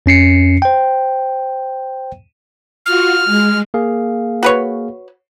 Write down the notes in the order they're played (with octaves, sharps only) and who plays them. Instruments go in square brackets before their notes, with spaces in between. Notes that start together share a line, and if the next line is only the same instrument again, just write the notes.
[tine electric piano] F2 C#4 C7 C#7
C5 G5
[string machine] F4 F#4 [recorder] F6
[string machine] G#3
[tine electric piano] A#3 G#4 F5
[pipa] F#4 B4 C#5